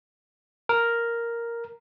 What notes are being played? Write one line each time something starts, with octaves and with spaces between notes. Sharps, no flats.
A#4